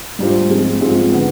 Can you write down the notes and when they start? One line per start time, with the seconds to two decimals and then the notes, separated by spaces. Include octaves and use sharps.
0.19 G#2 G3 D4 F4 C5
0.50 G#2 F3 G#3 C4 F4
0.81 G#2 F3 G#3 C4 F4
1.12 D3 G#3 B3